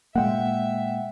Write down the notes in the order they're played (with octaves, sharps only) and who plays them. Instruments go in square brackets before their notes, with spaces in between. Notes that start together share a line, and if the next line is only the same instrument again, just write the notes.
[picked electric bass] A#2 G#3 A#3 [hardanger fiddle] E5 [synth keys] F#5 G5